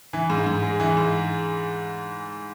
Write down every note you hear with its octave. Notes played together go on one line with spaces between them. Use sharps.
E3
G#2
G#2
G#3
E3
G#2